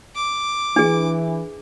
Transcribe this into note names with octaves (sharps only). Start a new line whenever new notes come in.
D6
E3 D4 G#4